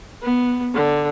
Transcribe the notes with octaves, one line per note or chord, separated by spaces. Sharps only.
B3
D3